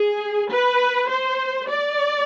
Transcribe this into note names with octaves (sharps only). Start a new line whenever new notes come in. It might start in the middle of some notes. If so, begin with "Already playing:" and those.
Already playing: G#4
B4
C5
D5